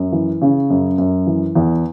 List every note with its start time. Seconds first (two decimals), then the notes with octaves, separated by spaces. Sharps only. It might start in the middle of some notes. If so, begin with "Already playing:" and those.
Already playing: F#2
0.12 E3
0.41 C#3
0.70 F#2
0.98 F#2
1.26 E3
1.55 E2